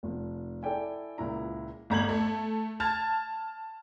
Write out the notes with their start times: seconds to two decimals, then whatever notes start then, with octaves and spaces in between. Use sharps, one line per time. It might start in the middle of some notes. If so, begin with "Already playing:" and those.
0.03 F1 F3
0.63 E4 A4 D5 G5 G#5
1.18 C#2 A#2 E4 A#5
1.90 G1 A#5 G#6 F#7
2.09 A3
2.80 A5 F6 G#6 A6